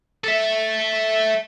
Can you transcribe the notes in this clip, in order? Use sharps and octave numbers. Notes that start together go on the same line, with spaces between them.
A4 E5